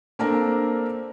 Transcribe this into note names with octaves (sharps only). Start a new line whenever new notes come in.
A#3 C4 D4 A4 A#4